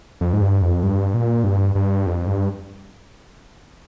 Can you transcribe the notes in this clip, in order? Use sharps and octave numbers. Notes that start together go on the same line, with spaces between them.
F2
G#2
G2
F2
G2
A#2
G2
G2
F2
G2